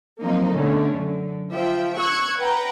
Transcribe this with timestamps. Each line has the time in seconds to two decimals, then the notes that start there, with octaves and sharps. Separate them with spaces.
0.21 F3 F#3 A#3 C4 D#4
0.54 B2 D3 A3 C#4
0.95 F#2 D3
1.52 F3 E5 G5
1.97 C#6 E6 F#6 G#6 C#7
2.38 B4 F#5 G5 A#5